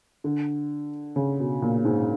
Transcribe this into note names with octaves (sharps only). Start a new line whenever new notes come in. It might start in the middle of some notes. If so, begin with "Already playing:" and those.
D3
C#3
B2
A#2
G#2